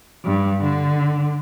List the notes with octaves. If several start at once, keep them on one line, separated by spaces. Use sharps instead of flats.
G2
D3